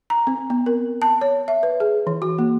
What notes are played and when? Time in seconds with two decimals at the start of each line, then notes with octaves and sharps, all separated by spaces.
0.10 A#5
0.27 C4
0.50 B3
0.66 A#4
1.02 A5
1.21 C#5
1.48 E5
1.63 B4
1.80 G#4
2.07 E3
2.22 F#4
2.39 A#3